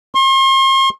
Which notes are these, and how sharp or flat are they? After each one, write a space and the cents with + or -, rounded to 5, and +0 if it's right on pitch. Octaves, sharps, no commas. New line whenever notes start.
C6 +40